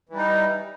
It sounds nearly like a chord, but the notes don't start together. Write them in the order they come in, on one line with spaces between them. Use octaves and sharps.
E3 G3 D#4